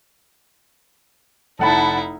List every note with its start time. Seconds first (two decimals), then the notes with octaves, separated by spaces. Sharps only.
1.59 F1 D#4 E4 F#5 A5 B5